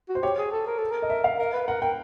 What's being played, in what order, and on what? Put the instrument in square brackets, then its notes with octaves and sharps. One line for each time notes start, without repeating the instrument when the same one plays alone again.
[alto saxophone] F#4
[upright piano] C5
[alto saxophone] G4 [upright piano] C#5
[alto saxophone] G#4
A4
A#4
A4
A#4
[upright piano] D#5
E5
F5
[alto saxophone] A#4
B4
[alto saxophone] A#4 [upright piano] F#5
[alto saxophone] A#4 [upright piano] G5